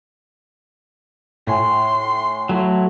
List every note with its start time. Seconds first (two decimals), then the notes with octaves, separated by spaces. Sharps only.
1.47 A2 G#5 C6
2.49 F#3 A3 E4